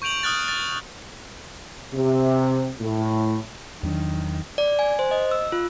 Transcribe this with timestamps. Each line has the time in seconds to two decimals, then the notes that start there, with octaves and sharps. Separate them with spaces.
0.02 C#6 G6 D7 F7 F#7
0.23 D#6 F6 F#6 A6
0.48 A6
1.94 C3
2.80 A2
3.83 E2 D#3 F#3 D4
4.58 D5
4.79 G#5
4.99 C5
5.11 D#5
5.31 E6
5.52 F4